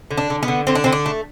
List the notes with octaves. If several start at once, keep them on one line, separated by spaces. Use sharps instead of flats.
D3
D4
D3
B3
D3
D3 C4
D4
D3 C4
D4
A3